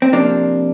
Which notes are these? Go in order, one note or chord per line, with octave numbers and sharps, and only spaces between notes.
C4
C3 F3 A#3 D4